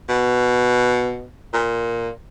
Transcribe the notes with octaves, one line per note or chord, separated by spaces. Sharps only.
B2
A#2